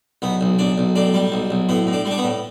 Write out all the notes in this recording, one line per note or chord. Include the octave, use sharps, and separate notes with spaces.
B1 B3
B1
B1 D4
B1
A2 D4
G3
B1
B1
A2 B3
A2
D4
G3
D4
B3
A2